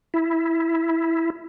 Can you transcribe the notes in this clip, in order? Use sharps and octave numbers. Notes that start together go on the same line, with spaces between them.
E4